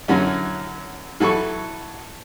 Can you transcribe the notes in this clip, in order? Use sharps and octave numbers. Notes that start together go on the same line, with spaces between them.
F#2 D3 E3 F#3 C#4
E3 F#3 A4 B5 C#6